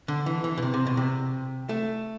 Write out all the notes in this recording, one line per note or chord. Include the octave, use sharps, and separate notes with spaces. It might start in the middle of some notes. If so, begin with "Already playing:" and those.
D3
E3
E3
B2
C3
C3
B2
C3
A3